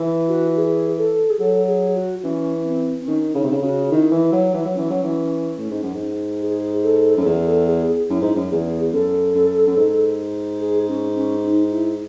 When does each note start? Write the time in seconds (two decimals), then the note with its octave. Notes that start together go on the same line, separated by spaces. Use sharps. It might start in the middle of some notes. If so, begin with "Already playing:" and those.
Already playing: E3
0.28 F#4
0.56 G#4
0.98 A4
1.30 G#4
1.40 F#3 A4
1.68 G#4
1.96 F#4
2.23 E3 C#4
2.65 C4
3.00 C4
3.07 D#3 C#4
3.35 C#3 D#4
3.43 C3
3.51 C#3
3.62 C#3 F#4
3.91 D#3 E4
4.11 E3
4.32 F#3
4.54 E3
4.65 F#3
4.74 E3 C#4
4.90 F#3
5.03 E3
5.58 A2
5.70 G#2
5.83 F#2
5.94 G#2
6.42 G#4
6.84 A4
7.17 F#2 A4
7.25 E2 G#4
7.46 A4
7.67 G#4
7.88 G#4
8.09 F#2 E4
8.21 G#2
8.35 F#2
8.51 E2 G#4
8.93 F#2 A4
9.35 F#2
9.67 F#2
9.77 G#2
10.60 G#4
10.88 C#4
11.16 C#4
11.44 D#4
11.72 E4